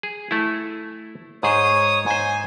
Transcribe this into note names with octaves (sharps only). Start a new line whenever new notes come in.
G#4
A3 E4
G#2 G#4 C5 C#5 D#6
G#2 C5 G#5